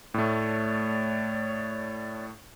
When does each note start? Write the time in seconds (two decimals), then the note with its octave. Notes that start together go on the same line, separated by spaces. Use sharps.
0.14 A2 A3 C#5 D5